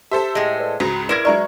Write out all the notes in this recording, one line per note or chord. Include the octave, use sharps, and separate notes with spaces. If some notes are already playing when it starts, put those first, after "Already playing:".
G4 A4 C5 E5 A5
A2 G#3
B4 D5
C#2 G#2 C#3 F#4 A#5
E4 A#4 B4 D5 C6 G#6 E7
F#3 G#3 D5 E5 A#5 C#6 F6